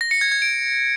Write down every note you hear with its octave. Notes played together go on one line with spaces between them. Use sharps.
A#6
C#7
G#6
G#6
D7